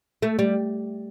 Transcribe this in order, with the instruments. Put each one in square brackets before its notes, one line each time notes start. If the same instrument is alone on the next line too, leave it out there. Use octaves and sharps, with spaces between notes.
[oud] A3
G3